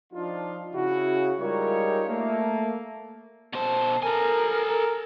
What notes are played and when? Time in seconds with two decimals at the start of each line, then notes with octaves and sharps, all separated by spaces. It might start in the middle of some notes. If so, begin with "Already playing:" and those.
0.13 F3 D4 D#4 F4
0.74 C#3 E4 F#4
1.40 G3 G#3 D#4 F4 A#4 C#5
2.08 A3 A#3
3.53 B2 C5 A5
4.03 A4 A#4 G#5
4.68 A#4